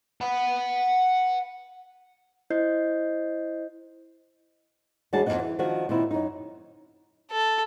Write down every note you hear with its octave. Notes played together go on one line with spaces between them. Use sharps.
F#5 B5
E4 C5 D#5 G6 C7
D#2 G3 D4 F#4 G#4 A5
F2 C#3 A#3 D#4 F#5
E3
D#3 F3 D4 F#4
A#2 D#3 C4 E4
F#2 D#4
A4